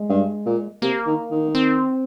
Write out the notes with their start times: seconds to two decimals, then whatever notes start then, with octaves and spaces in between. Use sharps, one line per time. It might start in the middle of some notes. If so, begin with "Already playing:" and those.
Already playing: G#3
0.09 G2
0.46 A#2
0.82 C3 A#3
1.07 D#3
1.31 D#3
1.55 C4